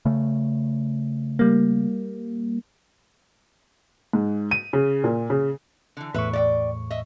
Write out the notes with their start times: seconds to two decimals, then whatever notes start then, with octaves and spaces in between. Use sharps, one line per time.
0.05 C#3 A3
1.39 G3 A#3
4.13 G#2
4.51 D#7
4.73 C#3
5.04 A#2
5.30 C#3
5.97 D3 E3
6.14 E2 A2 B4 E5 C#6
6.33 D5 E5 G5
6.90 D#5 E5